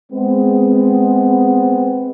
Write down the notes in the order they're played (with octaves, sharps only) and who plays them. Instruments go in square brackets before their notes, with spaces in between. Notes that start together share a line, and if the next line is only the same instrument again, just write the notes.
[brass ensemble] G#3 B3 C4